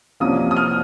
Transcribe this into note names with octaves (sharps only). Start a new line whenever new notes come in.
C2 C3 F3 A#3 C#4 D#6
D#6
F6